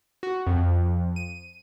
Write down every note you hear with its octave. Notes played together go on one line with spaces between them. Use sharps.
F#4
F2
D#7